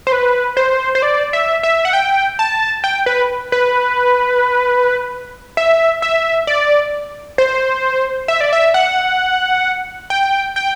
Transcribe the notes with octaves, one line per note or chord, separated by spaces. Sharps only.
C5
B4
C5
C5
D5
E5
E5
F#5
G5
A5
G5
B4
B4
E5
E5
D5
C5
E5
D5
E5
F#5
G5
G5